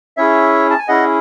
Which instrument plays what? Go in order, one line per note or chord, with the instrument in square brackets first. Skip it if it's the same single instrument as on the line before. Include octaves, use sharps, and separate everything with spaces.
[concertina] C#4 E4 G#4 C#5 E5
A5
G#5
C#4 E4 G#4 D#5 F#5